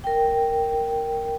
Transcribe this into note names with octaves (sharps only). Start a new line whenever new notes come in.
A#4 G5